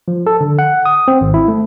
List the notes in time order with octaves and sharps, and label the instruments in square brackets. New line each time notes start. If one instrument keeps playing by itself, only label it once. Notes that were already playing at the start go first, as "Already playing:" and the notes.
[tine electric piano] F3
A4
D3
F#5
D#6
C4
G#1
E4
A3